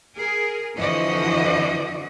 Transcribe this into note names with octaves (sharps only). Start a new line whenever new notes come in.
G#4 A#4
F2 D3 E3 F3 F#4 D#5